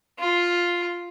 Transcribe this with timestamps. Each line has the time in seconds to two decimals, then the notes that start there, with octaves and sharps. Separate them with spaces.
0.19 F4